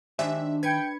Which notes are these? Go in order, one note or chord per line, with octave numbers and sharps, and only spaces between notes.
D#3 D4 G4 C5 E5 G#5
B4 G5 G#6 C#7